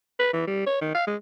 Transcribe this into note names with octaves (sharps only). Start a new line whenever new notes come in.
B4
E3
G3
C#5
D#3
F5
G#3